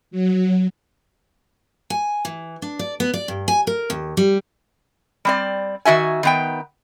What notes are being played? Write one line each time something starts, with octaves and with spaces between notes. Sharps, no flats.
F#3
G#5
E3
D4
D5
B3
D5
G2
G#5
A#4
D#2
G3
G3 C4 D5
D#3 F#4 E5 G#5
D#3 B3 G5